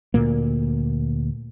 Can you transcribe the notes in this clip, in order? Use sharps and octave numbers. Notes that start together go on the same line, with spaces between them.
D2 A#2 A#3